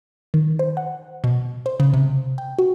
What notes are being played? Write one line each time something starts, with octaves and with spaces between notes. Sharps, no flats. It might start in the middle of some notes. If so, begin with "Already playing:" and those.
D#3
C5
F#5
B2
C5
C#3
C3
G5
F#4